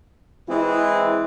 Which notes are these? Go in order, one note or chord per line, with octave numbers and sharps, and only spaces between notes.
E3 G#3 C4 E4